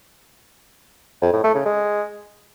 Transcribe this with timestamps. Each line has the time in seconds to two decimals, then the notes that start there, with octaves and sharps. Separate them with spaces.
1.22 F2
1.33 A2
1.44 A3
1.55 C#3
1.66 G#3